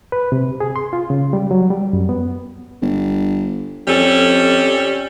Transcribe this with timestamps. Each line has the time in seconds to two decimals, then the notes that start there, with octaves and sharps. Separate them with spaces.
0.12 B4
0.32 C3
0.60 G#4
0.76 C6
0.93 F4
1.10 C#3
1.33 G3
1.51 F#3
1.70 G3
1.93 F#2
2.09 B3
2.82 G1
3.88 F2 G3 C#4 A4